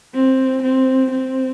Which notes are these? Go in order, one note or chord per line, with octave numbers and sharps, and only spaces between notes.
C4
C4
C4